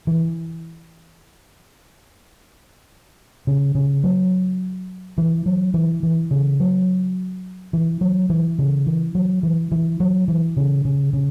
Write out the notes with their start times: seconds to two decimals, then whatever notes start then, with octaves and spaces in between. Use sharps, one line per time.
0.07 E3
3.47 C#3
3.75 C#3
4.04 F#3
5.18 E3
5.46 F#3
5.74 E3
6.03 E3
6.31 C#3
6.60 F#3
7.73 E3
8.01 F#3
8.30 E3
8.59 C#3
8.86 E3
9.15 F#3
9.43 E3
9.72 E3
10.00 F#3
10.28 E3
10.57 C#3
10.85 C#3
11.13 C#3